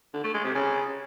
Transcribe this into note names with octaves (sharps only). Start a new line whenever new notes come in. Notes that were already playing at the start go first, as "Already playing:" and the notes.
D3
A3
G#3
C3
C#3